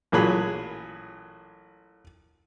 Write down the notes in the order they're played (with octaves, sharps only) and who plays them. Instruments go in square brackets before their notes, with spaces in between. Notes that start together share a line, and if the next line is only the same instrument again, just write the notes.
[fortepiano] A1 A#2 F#3 G#4 B5